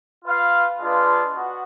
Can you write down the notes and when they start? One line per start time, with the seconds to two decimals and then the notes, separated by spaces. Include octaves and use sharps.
0.24 F4 B4 F5
0.79 G#3 D4 F4 B4
1.34 B3 F#4